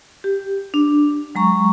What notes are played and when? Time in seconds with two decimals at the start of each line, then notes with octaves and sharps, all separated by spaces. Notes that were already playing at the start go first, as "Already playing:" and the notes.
0.24 G4
0.74 D4
1.35 F#3 G#3 A#5 C#6